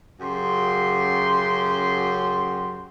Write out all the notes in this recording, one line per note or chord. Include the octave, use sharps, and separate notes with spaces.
F#2 C#3 G4 C6